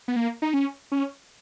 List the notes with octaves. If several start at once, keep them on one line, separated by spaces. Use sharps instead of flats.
B3
A#3
D#4
C#4
C#4